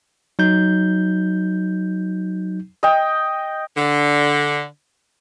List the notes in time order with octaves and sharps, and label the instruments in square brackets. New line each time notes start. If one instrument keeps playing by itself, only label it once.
[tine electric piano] F#3 D#4 G6
[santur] D#5 G5
[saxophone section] D3